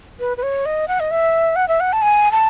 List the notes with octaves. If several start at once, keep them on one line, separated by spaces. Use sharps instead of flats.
B4
B4
C#5
D#5
F#5
D#5
E5
F#5
E5
F#5
A5
G#5
A5